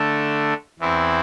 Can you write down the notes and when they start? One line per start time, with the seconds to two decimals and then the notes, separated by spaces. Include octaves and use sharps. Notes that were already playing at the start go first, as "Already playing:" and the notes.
Already playing: D3 A3 D4
0.79 E2 E3 C4 E4